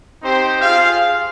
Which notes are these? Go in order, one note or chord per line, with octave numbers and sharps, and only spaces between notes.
C4 D#4 G4 C5 G5
F4 G#4 C5 F5